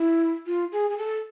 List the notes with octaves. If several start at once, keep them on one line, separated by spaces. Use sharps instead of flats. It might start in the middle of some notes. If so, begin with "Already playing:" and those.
Already playing: E4
F4
G#4
G#4
A4